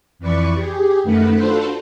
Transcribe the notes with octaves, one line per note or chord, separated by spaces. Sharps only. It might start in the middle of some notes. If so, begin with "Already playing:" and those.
F2 E3 B4 D5 C#6
G4 G#4
F#2 D#3 A3 B4 F#5
D4 F4 F#4 A4 B4 C5